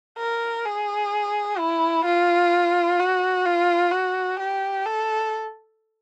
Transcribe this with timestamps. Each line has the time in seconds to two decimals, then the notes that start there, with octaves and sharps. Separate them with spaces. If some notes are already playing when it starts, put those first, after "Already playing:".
0.19 A#4
0.65 G#4
1.58 E4
2.05 F4
2.99 F#4
3.45 F4
3.92 F#4
4.40 G4
4.86 A4